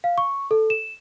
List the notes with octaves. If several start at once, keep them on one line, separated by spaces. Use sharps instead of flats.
F5
C#6
A4
E7